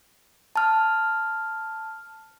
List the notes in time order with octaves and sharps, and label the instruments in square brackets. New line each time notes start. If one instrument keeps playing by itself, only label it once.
[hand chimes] A5 F6